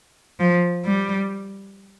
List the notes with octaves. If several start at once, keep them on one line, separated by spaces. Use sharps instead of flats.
F3
G3